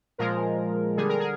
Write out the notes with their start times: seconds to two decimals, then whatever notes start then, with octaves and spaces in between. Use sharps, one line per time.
0.18 A#2 F3 G#3 A#4
0.97 D3 G3 G#4
1.09 A#4
1.20 G#4